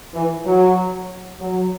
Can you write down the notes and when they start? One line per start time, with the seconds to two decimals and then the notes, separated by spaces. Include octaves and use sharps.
0.15 E3
0.45 F#3
1.40 F#3